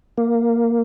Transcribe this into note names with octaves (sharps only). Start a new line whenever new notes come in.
A#3